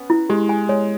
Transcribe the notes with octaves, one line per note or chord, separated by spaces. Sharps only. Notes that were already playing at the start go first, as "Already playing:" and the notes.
Already playing: B3 C#4
E4
G#3 G4
G#5
G#3 C#5